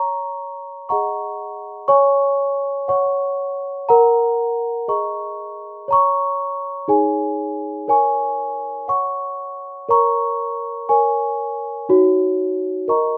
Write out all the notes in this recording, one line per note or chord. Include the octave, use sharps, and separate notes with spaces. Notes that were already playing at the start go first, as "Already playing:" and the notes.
Already playing: C#5 A#5 C#6
G#4 D#5 F#5 A#5 C#6
C#5 G#5 C#6
C#5 F#5 C#6
A#4 F#5 A#5
G#4 D#5 A#5 C#6
C#5 A#5 C#6
D#4 G#4 C#5 G#5
A#4 C#5 G#5 C#6
C#5 F#5 C#6
A#4 C#5 A#5 C#6
A#4 C#5 G#5 C#6
D#4 F#4 C#5
A#4 D#5 A#5 C#6